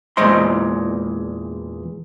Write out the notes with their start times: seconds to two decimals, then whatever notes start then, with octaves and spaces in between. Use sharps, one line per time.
0.17 E2 A#2 G#3 C5 D#5 C6